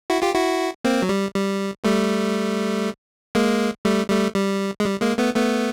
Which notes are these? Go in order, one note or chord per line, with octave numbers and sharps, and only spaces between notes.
E4 F#4
F4 G4
E4 F#4
A#3 C4
F#3
G3
G3
G3 A3
G#3 A#3
G3 A3
G3 A3
G3
G#3
G3
G#3 A#3
A3 B3
A3 B3